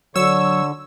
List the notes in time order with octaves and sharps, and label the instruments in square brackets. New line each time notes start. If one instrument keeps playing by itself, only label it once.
[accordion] D3 [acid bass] F#3 [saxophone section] C#5 [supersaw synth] E6